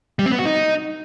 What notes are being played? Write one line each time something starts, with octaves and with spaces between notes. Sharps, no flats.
G3
C4
B3
F#4
D#4